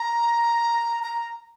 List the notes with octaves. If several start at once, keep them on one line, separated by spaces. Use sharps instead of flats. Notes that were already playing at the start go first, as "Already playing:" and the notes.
Already playing: A#5
A#5